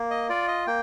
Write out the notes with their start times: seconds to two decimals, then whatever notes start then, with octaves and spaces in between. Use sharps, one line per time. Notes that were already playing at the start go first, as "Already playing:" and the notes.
Already playing: A#3
0.11 D#5
0.29 F4 D5
0.48 D#5
0.67 A#3 G5